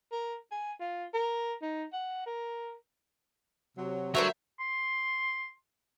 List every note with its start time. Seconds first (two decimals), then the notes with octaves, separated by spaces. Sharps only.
0.12 A#4
0.51 G#5
0.81 F4
1.14 A#4
1.62 D#4
1.93 F#5
2.26 A#4
3.78 C3 F#3
4.15 D3 F#3 G3 A3 A#4 C5 E5
4.60 C6